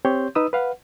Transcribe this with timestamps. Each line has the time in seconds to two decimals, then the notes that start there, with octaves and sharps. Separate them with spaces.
0.05 C4 G4 C#5 C6 G6
0.35 D#4 B4 D#6 E6
0.53 B4 F5 F#5